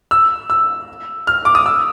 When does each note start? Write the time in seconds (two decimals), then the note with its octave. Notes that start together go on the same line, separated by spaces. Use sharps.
0.11 E6
0.50 E6
1.27 F6
1.45 D6
1.55 D#6
1.66 E6